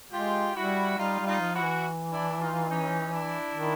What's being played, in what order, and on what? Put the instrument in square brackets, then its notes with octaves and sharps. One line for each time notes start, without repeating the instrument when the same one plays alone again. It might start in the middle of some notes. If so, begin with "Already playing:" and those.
[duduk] G#3 [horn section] F4 G4
[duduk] G3 [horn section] E4 F#4
[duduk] G3 [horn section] D#4 F4
[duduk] G3
[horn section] D#4 F4
[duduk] F3
[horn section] E4 F#4
[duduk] E3
[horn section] D4 E4
D#4 F4
C#4 D#4
D4 E4
[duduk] D#3